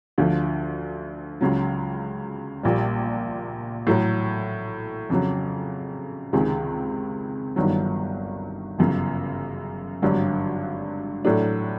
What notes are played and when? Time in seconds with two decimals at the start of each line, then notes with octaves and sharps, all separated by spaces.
0.18 D2 D3 F3
1.41 C#2 C#3 F#3
2.63 A#1 A#2 G3
3.87 A2 F#3 A3
5.10 F2 C#3 F#3
6.33 C#2 C3 D#3 G#3 C4
7.56 G1 G2 D#3 F#3
8.78 G1 F#2 C#3
10.02 G#1 G2 D3 F#3
11.25 A2 F#3 A3 D4